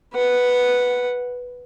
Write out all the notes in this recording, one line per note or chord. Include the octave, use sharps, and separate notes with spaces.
B4 F#5